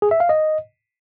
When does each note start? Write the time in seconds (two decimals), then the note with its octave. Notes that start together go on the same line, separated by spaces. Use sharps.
0.02 G#4
0.11 E5
0.20 F5
0.29 D#5